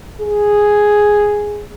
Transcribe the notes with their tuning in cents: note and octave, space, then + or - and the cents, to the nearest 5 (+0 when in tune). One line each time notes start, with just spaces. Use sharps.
G#4 +0